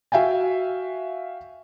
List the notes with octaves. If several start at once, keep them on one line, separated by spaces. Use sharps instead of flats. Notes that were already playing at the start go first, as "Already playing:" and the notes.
F#4 E5 F5 G5 G#5